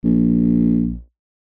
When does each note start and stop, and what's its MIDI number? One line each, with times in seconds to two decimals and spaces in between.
0.04 0.98 34